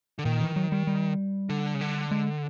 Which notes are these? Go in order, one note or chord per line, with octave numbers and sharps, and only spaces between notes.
D3
A#2 D#3
E3
F#3
G3
G3
D3
C#3
D3
G#3